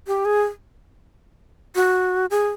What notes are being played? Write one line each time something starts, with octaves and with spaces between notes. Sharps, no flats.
G4
G#4
F#4
G#4